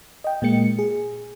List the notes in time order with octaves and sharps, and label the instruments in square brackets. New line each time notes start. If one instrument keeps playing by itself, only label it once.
[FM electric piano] D#5 G5
A#2 G#3 A#3 C#7
G#4